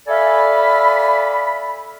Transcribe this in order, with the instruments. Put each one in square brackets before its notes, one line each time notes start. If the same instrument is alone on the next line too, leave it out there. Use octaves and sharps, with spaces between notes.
[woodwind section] A4 D5 E5 F5 G#5 B5